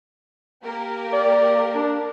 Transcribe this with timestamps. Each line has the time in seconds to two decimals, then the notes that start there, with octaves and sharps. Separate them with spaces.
0.63 A#3 G4 A#4
1.13 D5
1.74 D4